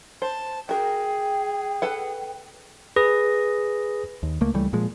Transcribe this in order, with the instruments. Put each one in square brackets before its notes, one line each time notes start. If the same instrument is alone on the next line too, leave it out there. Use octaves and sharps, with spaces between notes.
[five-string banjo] C5 [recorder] A5
[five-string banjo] F#4 A#4 [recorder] G#4 [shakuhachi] G5
[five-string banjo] A4 B4 F#5
[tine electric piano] G#4 B4 D#6 A#6
[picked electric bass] D#2
C#2 A3 A#3
C#2 E3 G3 A3
A#2 F3 G#3